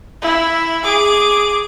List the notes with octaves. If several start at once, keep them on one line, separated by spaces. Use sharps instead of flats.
E4
G#4 D6